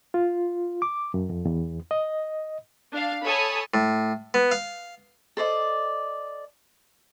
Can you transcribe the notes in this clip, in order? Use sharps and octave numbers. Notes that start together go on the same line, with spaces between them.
F4
D6
F#2
F2
E2
D#5
D4 F5
A4 C#5 G#5 A5 B5 D#6
A2
B3
F5
A4 C5 D5 D#5